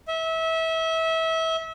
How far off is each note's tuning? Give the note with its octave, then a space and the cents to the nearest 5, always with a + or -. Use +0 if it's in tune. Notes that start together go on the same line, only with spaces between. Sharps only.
E5 -25